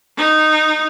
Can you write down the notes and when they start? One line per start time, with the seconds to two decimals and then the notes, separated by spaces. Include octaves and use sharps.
0.17 D#4